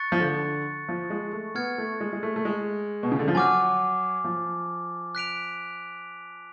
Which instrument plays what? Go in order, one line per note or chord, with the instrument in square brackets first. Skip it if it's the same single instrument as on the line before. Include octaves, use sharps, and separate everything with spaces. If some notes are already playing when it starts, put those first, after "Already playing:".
Already playing: [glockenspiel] C#6 F#6 A6 C#7
[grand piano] F3
D3
F3
G#3
A3
[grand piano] B3 [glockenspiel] F6 G#6 C#7
[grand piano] A3
G#3
G#3
A3
A3
G#3
B2
C#3
D3
F3
[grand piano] F#3 [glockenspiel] G#5 D6 F6
[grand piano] F3
[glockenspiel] F#6 B6 D7 F7